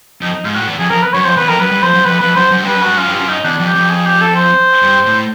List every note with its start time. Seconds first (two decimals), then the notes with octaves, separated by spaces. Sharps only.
0.21 F2 D#4
0.32 D#4
0.44 G#2 F4
0.55 A2 F#4
0.67 E2
0.79 F2 G#4
0.90 F2 A#4
1.02 B4
1.13 F#2 C#5
1.25 F2 C5
1.37 E2 B4
1.48 F2 A#4
1.59 F#2 B4
1.71 G2
1.82 F2 C5
1.94 F#2
2.05 F2 B4
2.21 F2 B4
2.36 F#2 C5
2.51 F#2
2.63 G2 B4
2.75 F#2
2.82 G2 F#4
2.97 F#2 F4
3.08 G2 F4
3.19 F#2
3.29 D#4
3.44 E2 D4
3.60 F2
3.67 G4
3.75 F2
3.90 G#4
4.06 G4
4.21 A4
4.36 C5
4.82 G2
5.06 A2